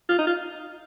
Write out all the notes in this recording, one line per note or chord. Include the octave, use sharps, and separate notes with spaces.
F4
D#4
F4